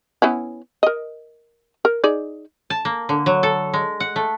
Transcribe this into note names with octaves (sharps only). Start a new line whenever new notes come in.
B3 C#4 E4
A#4 D#5
A#4
D#4 G#4 D5
A5
A#3
D3
F#3
A4
G#3
F#5
A3